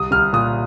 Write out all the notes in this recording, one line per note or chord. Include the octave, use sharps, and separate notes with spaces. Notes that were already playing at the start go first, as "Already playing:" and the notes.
Already playing: C2 D#6
C2 F6
A#2 D#6